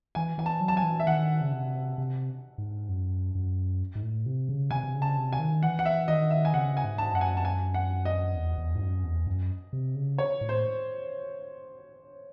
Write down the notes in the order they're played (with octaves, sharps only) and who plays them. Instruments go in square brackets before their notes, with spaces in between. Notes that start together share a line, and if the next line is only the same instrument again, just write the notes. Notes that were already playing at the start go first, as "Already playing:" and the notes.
[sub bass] E3 [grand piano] G#5
[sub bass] E3 [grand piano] G#5
[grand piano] A5
[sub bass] F#3
[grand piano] A5
G#5
[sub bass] E3
[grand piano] E5
[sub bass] D#3 [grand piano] F#5
[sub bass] C#3
C3
C3
G#2
F#2
F#2
G#2
A2
C3
C#3
[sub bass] C3 [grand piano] G#5
[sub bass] C3
C#3
[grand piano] A5
[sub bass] C3
[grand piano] G#5
[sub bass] D#3
[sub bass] E3 [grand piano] F#5
[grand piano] F#5
E5
[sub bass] D#3 [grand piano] D#5
[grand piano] E5
G#5
[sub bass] C#3 [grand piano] F#5
[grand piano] G#5
[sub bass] G#2
[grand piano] A5
[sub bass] F#2 [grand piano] F#5
[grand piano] G#5
A5
G#5
F#5
D#5
[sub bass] E2
E2
G#2
F#2
E2
F#2
C3
C#3
[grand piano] C#5
[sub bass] A2
[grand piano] C5